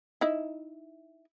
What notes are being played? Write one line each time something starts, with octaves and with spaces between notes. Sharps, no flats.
D#4 E4